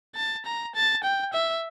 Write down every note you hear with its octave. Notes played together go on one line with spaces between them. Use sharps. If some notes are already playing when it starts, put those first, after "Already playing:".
A5
A#5
A5
G5
E5